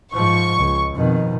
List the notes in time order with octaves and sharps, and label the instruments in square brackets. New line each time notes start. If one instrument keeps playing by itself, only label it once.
[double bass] G#2 F3 [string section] C#6
[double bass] C#2
[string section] F2 [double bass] B2 D#3